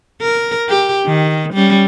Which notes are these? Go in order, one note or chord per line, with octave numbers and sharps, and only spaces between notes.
A#4
G4
D#3
G3 C#4